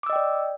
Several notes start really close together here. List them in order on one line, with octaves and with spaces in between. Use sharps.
D6 E6 D#5 G5 D5